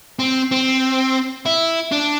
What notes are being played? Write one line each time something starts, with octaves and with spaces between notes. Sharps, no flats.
C4
C4
E4
D4